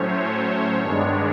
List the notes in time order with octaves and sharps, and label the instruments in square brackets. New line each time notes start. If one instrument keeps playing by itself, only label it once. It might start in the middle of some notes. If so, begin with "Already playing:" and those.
Already playing: [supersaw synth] A2 F#3 A3 C#4 C5 C#5
C#5
G2 D#3 G#3 B3 D4